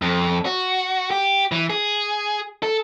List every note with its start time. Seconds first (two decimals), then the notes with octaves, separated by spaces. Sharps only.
0.02 F2
0.45 F#4
1.11 G4
1.52 E3
1.70 G#4
2.63 A4